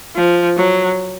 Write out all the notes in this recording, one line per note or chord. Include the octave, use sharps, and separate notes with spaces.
F3
F#3